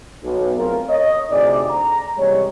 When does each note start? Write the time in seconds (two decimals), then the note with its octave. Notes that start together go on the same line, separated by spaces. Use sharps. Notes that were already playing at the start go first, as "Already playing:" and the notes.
0.23 B1
0.57 A3 C4 F4 G#4 A#4
0.88 C#5 D#5
1.31 D2 A2 C3 D#4 G#4 D5
1.69 A#5
2.17 A1 D#2 C3 G3 G#3 C#5